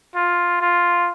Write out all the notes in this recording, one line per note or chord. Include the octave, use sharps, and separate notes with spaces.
F4
F4